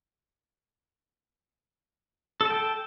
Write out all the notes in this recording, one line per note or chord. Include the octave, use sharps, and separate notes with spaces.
A4 G5 A5